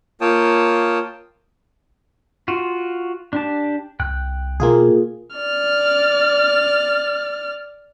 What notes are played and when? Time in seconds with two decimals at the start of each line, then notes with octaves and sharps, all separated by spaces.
0.21 A#3 F4 C#5 G5 A5 D#6
2.48 F4 F#4
3.33 D4 G4 A5
4.00 C2 G5 F#6
4.60 B2 A#3 F4 G#4
5.37 D5 F6